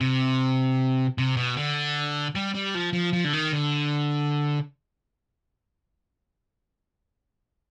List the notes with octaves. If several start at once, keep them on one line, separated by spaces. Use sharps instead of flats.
C3
C3
B2
D3
G3
G3
F3
F3
F3
D3
D#3
D3